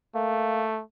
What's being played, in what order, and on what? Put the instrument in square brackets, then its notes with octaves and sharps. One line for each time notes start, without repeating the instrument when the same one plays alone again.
[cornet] A3 [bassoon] A#3